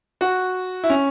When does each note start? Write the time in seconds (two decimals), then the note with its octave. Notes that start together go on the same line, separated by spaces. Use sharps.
0.21 F#4
0.84 E4
0.90 C#4